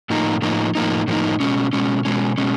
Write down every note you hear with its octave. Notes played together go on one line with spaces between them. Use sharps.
A2 F3 A#3 D#4
A2 F3 A#3 D#4
A2 F3 A#3 D#4
A2 F3 A#3 D#4
B2 G#3 C#4
B2 G#3 C#4
B2 G#3 C#4
B2 G#3 C#4